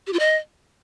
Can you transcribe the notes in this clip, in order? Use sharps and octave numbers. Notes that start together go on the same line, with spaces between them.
G4
F4
D#5